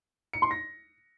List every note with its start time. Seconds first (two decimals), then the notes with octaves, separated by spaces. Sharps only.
0.33 C#7
0.42 C6
0.51 A#6